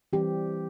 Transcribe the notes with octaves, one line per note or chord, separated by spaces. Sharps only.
E3 G3 C4 G4